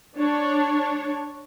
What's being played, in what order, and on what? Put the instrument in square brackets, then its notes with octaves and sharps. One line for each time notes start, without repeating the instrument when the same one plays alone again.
[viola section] D4 C#5